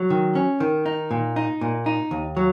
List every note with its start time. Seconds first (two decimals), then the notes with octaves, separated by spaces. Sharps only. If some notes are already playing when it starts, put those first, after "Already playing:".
Already playing: F#3
0.10 D#3
0.35 C#4
0.60 D#3
0.86 D#4
1.11 A#2
1.36 D#4
1.61 A#2
1.86 D#4
2.11 D#2
2.37 F#3